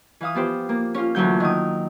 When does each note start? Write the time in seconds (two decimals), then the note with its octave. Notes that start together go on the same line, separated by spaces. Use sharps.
0.21 E3 F5 D#6
0.34 F3 B3 G4 C5
0.69 A#3
0.94 C#4 F4
1.15 D2 E3 F#3 G6
1.40 D#3 D#6